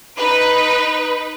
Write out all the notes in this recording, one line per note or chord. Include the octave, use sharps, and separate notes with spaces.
D#4 B4